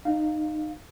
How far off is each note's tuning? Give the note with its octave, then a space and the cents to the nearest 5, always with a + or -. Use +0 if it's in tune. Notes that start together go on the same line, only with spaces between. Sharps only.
D#4 -20 F5 +0